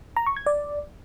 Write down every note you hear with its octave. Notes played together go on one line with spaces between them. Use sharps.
A#5
C#6
G#6
D5